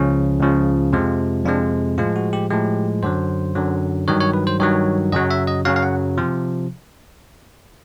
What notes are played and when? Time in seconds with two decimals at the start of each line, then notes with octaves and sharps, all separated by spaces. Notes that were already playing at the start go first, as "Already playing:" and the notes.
Already playing: C#2 C#3 F3 C#4
0.40 C#2 C#3 F3
0.93 F2 C3 F3 G#3
1.45 F2 C3 F3 G#3 D4
1.98 A2 F3 G#3 F4
2.16 F#4
2.33 G4
2.50 A2 F3 G#3 G4
3.03 F#2 D3 F#3 C5
3.56 F#2 D3 F#3
4.08 G2 D#3 F#3 C#5
4.20 C#5
4.34 B4
4.47 C5
4.60 G2 D#3 F#3 C#5
5.12 F#2 C#3 F#3 D#5
5.31 E5
5.47 D#5
5.65 F#2 C#3 F#3 F5
5.76 F5
5.82 F#5
6.18 C3 F3